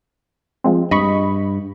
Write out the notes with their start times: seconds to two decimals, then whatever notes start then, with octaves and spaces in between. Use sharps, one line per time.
0.64 F3 G#3 C4
0.91 G2 D#5 B5 C#6